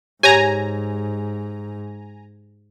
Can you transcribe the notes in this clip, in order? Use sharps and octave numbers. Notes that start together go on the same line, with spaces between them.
G#2 G4 C#5 G#5 A#5